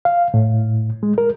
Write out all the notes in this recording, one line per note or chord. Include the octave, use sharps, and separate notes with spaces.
F5
A2
G#3
A#4